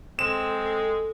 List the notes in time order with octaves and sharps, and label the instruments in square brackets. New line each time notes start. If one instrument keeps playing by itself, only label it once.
[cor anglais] G#3 [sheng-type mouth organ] C4 [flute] A4 [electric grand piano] E7